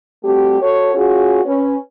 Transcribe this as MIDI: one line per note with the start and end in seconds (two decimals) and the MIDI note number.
0.24 0.60 55
0.24 0.60 57
0.24 0.60 60
0.24 0.60 66
0.24 0.60 67
0.61 0.92 66
0.61 0.92 69
0.61 0.92 73
0.94 1.41 61
0.94 1.41 65
0.94 1.41 66
0.94 1.41 68
1.45 1.75 61
1.45 1.75 71